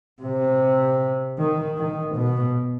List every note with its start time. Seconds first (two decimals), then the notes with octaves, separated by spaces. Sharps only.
0.22 C3
1.38 D#3
1.78 D#3
2.16 B2